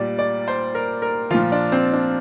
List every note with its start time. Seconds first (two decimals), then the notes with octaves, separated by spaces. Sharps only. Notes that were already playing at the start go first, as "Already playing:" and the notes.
Already playing: A#2 G3 D5
0.19 D5
0.48 C5
0.75 A#4
1.02 A#4
1.30 A#2 F3 F4
1.52 D4
1.72 C4
1.93 D4